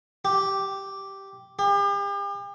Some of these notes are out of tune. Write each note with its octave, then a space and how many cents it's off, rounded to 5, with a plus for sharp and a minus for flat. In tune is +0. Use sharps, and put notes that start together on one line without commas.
G4 -5
G4 +40